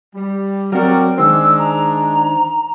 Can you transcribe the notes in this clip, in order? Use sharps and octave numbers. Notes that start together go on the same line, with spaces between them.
G3
F#3 C4 F#4 A#4 D5 G5
D#3 G#3 D4 D#4 C5 E6
A#5